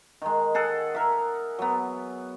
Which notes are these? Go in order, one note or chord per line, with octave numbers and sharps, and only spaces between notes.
D#3 G#3
G#4 A4 F#5
A#4 E5
F#3 B3